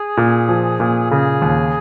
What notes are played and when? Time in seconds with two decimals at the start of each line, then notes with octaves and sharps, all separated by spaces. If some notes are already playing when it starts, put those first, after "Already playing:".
Already playing: G#4
0.17 A#2
0.48 F3
0.80 A#2
1.11 C#3 G#4
1.42 D#2